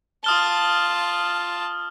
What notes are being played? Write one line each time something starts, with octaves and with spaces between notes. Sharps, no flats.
F4 A5 D#6 F6 G7